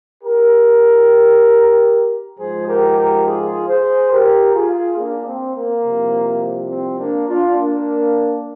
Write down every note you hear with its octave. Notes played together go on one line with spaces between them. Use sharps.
G4 A#4
G#2 F3 G#3 G#4 C5
G4 A#4
G4 A#4
F4 G#4
G#4 C5
G4 A#4
F4 G#4
A#3 D4
C4
A#3
C2 C3 F3
C4
A#3 D4
D4 F4
A#3 D4